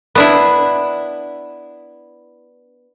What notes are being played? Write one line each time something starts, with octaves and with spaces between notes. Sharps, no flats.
B3 D4 E4